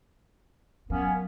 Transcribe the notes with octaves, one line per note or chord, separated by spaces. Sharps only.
F#3 A#3 B3 C#4